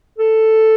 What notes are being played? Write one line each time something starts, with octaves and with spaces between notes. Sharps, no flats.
A4